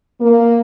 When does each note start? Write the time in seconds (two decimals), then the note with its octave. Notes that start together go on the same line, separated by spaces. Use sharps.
0.20 A#3